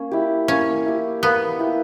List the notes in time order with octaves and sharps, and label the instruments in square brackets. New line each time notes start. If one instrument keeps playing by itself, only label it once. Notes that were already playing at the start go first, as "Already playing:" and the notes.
Already playing: [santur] A#3 [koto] C#4
[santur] E4 G4
[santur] A#3 [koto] C#4
[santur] E4 G4
[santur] A#3 [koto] B3
[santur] E4 G4